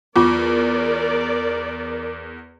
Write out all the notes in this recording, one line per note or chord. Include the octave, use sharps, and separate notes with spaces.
E2 F4 A#4 D5 C#6 D6